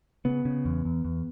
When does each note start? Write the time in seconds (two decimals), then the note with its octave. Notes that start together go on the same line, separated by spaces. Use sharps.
0.25 C#3 B3
0.45 C#3
0.65 E2
0.85 E2
1.05 E2